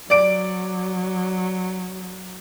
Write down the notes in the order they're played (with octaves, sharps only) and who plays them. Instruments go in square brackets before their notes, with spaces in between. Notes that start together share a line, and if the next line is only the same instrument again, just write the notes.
[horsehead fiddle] F#3 [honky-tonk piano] D5 D7